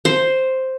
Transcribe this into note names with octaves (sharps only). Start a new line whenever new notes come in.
C5